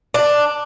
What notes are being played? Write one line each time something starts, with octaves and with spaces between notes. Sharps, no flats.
D4